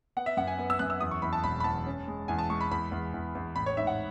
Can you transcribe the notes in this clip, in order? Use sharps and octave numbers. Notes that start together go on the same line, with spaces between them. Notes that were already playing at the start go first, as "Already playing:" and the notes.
B3 F#5
E5
F#2 F#5
G#5
B3
E6
F#2 F#6
E6
E2 D#6
C#6
E2 B5
A5
E1 B5
B5
E2 A5
C#4
G#3
E2 G#5
A5
G#3 C#6
B5
E2 B5
E2
E2
E2
A1 B5
C#5
G#2 E5
F#5